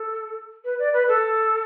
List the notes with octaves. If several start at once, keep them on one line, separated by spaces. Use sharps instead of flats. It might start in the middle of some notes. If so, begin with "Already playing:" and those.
Already playing: A4
B4
D5
B4
A4